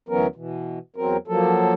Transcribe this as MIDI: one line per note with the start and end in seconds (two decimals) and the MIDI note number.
0.09 0.27 38
0.09 0.27 52
0.09 0.27 54
0.09 0.27 59
0.09 0.27 61
0.09 0.27 70
0.36 0.79 47
0.36 0.79 52
0.96 1.17 40
0.96 1.17 54
0.96 1.17 60
0.96 1.17 70
1.28 1.74 53
1.28 1.74 54
1.28 1.74 58
1.28 1.74 69